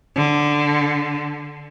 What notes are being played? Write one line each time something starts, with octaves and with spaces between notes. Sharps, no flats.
D3